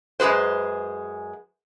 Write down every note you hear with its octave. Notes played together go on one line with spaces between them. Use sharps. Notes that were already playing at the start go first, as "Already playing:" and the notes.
F#2 G#3 G#4 B4 C5